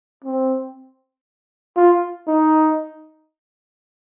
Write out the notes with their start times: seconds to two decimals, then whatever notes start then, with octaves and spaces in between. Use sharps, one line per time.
0.24 C4
1.76 F4
2.27 D#4